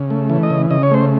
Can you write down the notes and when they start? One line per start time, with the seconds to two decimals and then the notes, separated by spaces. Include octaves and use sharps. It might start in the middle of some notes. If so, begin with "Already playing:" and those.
Already playing: C#3
0.10 A3
0.30 E3
0.43 D#5
0.50 C#3
0.70 C#3 D#5
0.83 C#5
0.91 A3 C5